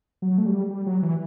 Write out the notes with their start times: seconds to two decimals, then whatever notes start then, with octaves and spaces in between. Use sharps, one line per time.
0.22 F#3
0.38 A3
0.46 G3
0.70 G3
0.86 F#3
1.03 E3